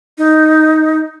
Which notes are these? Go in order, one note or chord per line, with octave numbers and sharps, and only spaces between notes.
D#4